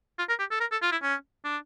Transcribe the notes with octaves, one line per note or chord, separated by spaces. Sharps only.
F4
A#4
G4
A4
A#4
A4
F4
E4
C#4
D4